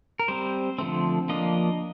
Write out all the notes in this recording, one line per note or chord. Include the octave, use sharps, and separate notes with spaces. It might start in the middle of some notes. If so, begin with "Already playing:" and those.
A#4
G3 C4 C5
D3 F3 A3 C4
F3 A#3 D4 D#5